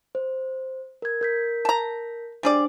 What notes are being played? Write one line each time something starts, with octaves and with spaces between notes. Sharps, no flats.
C5
A#4 G#6
A#4 G6 B6
A5 A#5
G3 D4 G#4 C5 D5